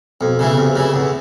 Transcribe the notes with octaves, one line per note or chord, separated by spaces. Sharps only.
F2 B2
C#3 E3
F2 C3
C#3 E3
E2